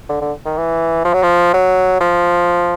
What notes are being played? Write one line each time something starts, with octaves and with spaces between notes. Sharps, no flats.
D3
D3
D#3
E3
F3
F#3
F3
F#3
F3